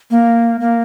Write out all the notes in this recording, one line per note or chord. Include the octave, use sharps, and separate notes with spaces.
A#3
A#3